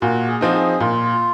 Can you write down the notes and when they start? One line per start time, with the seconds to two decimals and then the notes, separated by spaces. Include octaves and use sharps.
0.01 A#2 F#4
0.28 G#4
0.41 F3 C4 D#4
0.49 F#4
0.54 G#4
0.80 A#2 F4